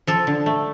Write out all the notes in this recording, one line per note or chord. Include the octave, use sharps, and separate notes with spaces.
F3 A4
D3
A3